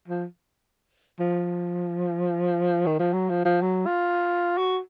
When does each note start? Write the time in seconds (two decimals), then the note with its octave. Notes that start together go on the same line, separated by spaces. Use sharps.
0.08 F3
1.20 F3
2.86 D#3
2.99 F3
3.13 F#3
3.29 F3
3.45 F3
3.62 F#3
3.86 F4
4.58 F#4